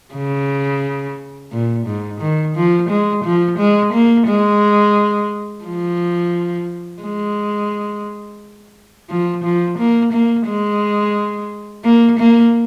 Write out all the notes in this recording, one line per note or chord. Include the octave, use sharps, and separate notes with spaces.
C#3
A#2
G#2
D#3
F3
G#3
F3
G#3
A#3
G#3
F3
G#3
F3
F3
A#3
A#3
G#3
A#3
A#3